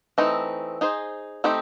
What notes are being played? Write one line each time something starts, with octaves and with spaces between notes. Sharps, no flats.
E3 A3 C4 D#4
D#4 G#4 C5
A3 C4 D#4 G4